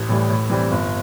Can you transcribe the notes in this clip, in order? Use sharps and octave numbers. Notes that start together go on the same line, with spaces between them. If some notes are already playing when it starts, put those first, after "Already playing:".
Already playing: A1
A2 E3 G3
A2
E3 G3 C4
G1